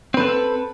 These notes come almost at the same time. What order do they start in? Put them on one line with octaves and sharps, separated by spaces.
C4 B4 A4